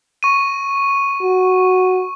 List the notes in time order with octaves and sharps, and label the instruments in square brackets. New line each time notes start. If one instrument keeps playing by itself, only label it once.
[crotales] C#6 D#7
[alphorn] F#4